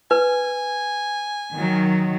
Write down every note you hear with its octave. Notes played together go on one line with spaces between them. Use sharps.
B4 G#5
D#3 F#3